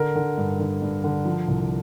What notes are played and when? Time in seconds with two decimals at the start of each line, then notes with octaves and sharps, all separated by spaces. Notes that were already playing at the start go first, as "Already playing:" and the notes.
Already playing: D3 A#4
0.15 D3
0.38 G2
0.59 D3
0.82 G2
1.04 D3
1.25 F3
1.47 C2